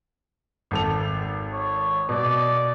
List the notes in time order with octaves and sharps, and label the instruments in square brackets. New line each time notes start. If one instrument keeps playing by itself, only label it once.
[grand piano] G#1 A4 F7
[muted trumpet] C#5
[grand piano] B2 [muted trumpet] D5